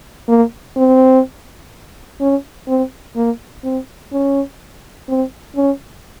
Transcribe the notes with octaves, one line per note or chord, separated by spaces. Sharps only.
A#3
C4
C#4
C4
A#3
C4
C#4
C4
C#4